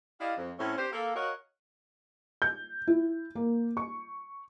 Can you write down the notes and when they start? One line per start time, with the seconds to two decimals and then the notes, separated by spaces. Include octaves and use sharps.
0.21 E4 G4 D5 D#5 F5
0.37 F2
0.59 A2 C4 C#4
0.78 C4 D4 G4 C5
0.92 A#3 A4
1.16 F#4 A#4 C#5 D#5 F5 F#5
2.42 G6
2.87 E4
3.35 A#3
3.77 C#6